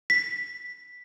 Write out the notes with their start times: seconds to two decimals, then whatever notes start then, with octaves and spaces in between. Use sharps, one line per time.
0.10 B6